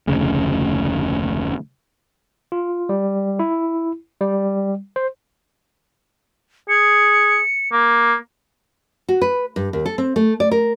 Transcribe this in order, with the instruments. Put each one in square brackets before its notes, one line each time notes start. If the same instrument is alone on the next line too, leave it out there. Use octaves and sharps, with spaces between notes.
[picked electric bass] F1 D2 C#3
[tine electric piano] F4
G3
E4
G3
C5
[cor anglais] G#4 [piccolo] C#7
[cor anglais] A#3
[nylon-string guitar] F#4
B4
G2
D#2
A4
C4
A3
D5
A#4